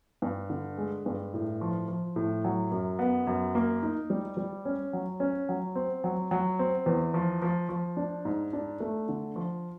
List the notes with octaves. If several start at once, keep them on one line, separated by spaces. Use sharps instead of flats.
G2
D3
G#3
G2
A2
F3
F3
A2
F#3
F#2
B3
F#2
A#3
D#4
G3
G3
C#4
F#3
C#4
F#3
C4
F#3
F#3
C4
E2
F3
F3
F3
D4
G#2
D4
A3
D3
F3